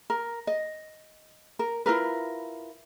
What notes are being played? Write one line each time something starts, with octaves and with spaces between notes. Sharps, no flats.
A#4
D#5
A#4
E4 F4 A#4 B4